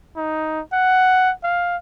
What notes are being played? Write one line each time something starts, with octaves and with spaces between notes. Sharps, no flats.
D#4
F#5
F5